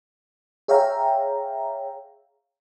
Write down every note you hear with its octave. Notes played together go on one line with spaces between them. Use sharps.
G#4 C#5 E5 F5 G5 A#5